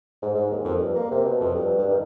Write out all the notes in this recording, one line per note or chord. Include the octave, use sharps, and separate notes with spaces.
G#2
G#2
D#2
F2
G2
A#3
C3
B2
F2
G2
G2
D#3